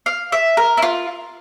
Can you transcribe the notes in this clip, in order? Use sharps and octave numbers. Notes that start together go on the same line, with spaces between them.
F5
E5
A#4
E4
F4